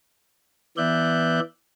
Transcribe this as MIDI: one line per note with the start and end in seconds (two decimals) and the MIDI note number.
0.77 1.40 52
0.77 1.40 59
0.77 1.40 74
0.77 1.40 76
0.77 1.40 90
0.77 1.40 91